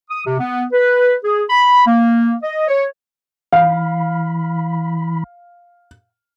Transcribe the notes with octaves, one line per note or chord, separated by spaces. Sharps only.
D#6
C3
B3
B4
G#4
B5
A#3
D#5
C#5
E3 F5 B5